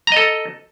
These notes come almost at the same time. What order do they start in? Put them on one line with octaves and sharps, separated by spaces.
A#5 D#5 A4